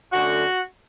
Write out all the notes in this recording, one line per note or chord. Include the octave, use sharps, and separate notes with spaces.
F#2 D3 A3 F#4